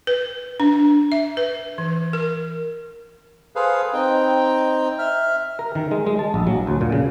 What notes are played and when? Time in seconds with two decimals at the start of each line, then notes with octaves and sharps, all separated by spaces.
0.07 B4
0.60 D4
1.12 E5
1.37 B4
1.78 E3
2.13 A#4
3.55 G#4 A4 B4 C5 F5
3.93 C4 D#4 G5
4.99 E5 F6
5.59 A#4
5.75 D#3
5.91 G#3
6.06 G#3
6.19 A5
6.34 A#1
6.47 F#3
6.67 D2
6.81 A#2
6.92 C#3